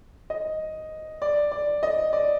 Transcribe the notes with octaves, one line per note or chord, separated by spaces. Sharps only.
D#5
D5
D5
D#5
D5